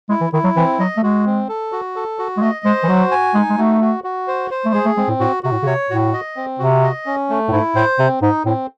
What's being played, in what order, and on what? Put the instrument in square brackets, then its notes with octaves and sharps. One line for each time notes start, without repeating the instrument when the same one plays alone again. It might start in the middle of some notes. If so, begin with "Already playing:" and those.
[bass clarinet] G#3 [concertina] E4
[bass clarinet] E3
[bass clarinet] D#3 [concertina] E4
[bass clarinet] F#3
[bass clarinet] E3 [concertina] C4
[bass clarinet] F#3 [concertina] D#5
[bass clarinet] A3
[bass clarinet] G#3 [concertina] F#4
[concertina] C4
A4
F#4
A4
F#4
[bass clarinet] G#3
[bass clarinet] A3 [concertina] D#5
[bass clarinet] G#3 [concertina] C5
[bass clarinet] E3
[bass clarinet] F#3 [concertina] F#4
[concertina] G#5
[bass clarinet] G#3 [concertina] D#4
[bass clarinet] G#3
[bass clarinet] A3 [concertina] F#4
[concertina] F#4
F#4
C5
C5
[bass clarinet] A3
[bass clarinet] G#3 [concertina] G#4
[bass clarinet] A3
[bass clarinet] G#3 [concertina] C4
[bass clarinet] A2
[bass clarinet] A2 [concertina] F#4
[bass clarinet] C3 [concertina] F#4
[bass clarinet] A2
C#3
[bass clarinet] C3 [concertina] C#5
[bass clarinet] A2 [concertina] F#4
[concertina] D#5
C4
[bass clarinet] C3 [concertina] F#4
[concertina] D#5
C#4
A3
[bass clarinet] A2
[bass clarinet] G#2 [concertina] E4
[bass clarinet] A2 [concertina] C5
[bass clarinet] C3 [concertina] C4
[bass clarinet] G#2 [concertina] D#4
[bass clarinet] A2 [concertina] C4